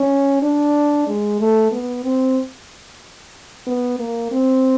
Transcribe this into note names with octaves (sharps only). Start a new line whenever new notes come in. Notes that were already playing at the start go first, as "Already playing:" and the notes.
Already playing: C#4
D4
G#3
A3
B3
C4
B3
A#3
C4